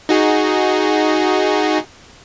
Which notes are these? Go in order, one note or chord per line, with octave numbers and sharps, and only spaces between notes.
D#4 F#4 G#4